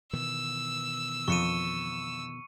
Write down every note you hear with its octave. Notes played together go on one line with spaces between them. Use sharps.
B2 D#3 E3 E6
F2 C#6 C#7 D#7